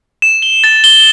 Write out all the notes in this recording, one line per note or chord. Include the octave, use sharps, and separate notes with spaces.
E7
G7
A6
G7